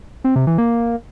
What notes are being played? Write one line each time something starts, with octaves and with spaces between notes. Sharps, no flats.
C4
C3
E3
A#3